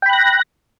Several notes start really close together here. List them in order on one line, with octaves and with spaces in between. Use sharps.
G5 B5 F#6 A#6